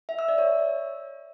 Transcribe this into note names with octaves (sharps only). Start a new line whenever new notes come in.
E5
E6
D5
C#5